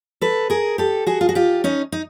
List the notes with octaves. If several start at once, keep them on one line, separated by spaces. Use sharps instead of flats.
A4 B4
G#4 A#4
G4 A4
F#4 G#4
F4
F#4
F4 G4
C#4 D#4
D#4